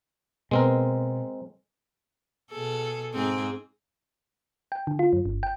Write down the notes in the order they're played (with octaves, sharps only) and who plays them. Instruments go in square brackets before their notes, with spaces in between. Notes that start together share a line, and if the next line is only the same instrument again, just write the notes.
[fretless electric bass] B2 [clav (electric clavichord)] G#3 C4 A#4
[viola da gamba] B2 G#4 A4
G#2 C4 G#4
[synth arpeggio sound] G5
D3
F4
F#2
G1
G5